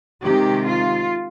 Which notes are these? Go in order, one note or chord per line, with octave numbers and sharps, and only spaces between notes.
C3 D#3 G#3 G4
F4